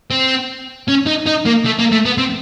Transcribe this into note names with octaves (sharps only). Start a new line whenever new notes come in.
C4
C#4
D#4
D#4
A#3
A3
A#3
A3
B3
C4